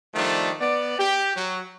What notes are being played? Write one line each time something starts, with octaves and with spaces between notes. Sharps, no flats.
D#3 F3 G3 A3 D4
B3 D5
G4
F#3